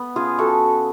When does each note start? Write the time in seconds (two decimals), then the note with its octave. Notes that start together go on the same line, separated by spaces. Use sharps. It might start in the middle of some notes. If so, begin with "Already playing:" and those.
Already playing: B3
0.16 C#3 F4 G#4
0.39 F#4 A4